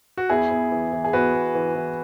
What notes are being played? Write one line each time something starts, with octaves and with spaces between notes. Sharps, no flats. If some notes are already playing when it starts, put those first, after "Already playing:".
F#4
E2 E4 G#4
E2
E3
E3
G#4
E2 F#4 B4
E2
E3
E3